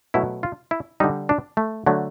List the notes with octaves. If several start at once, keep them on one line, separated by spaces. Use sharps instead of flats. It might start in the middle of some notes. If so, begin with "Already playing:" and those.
B2 F#3 A3 E4
F4
E4
D3 G3 D#4
D4
A3
D3 F#3 A3